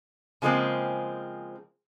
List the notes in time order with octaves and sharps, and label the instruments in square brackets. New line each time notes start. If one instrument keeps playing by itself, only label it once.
[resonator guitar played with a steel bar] C#3 F3 G#3 A#3 C4